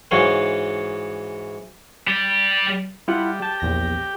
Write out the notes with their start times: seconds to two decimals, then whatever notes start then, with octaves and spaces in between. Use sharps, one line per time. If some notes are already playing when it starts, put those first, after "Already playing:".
0.11 G#2 E3 F#4 C#5 F5 C6
2.08 G3 G4
3.08 G3 E4 F4 F#5
3.42 G4 A5
3.60 A#1 E2 A#6